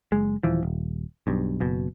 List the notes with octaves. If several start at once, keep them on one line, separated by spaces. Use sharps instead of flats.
F#1 G#3
D#1 E3 F3
D#1
B1 G2
F#1 B2